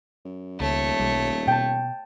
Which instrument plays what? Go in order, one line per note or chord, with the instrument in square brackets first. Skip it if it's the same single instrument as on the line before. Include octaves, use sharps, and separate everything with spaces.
[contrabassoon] F#2
[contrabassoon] D#1 [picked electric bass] C#2 [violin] A3 C#5
[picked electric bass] B1 G3
[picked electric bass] B2 [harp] G5 A5